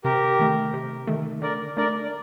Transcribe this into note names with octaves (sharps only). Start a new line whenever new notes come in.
C3 G4 A#4
D#3 A3
C3
D#3 A3
D3 A#4 D5
A3 D4 A#4 D5
D5